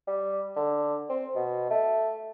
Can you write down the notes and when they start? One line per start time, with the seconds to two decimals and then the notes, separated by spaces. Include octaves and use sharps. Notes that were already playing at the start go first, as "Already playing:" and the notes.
0.08 G3
0.56 D3
1.09 C4
1.36 B2
1.71 A3